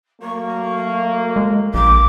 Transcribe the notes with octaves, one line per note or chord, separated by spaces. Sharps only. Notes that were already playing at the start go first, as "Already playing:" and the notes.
F#3 A3 A#3 C#6
G#3
A#1 A#3 D6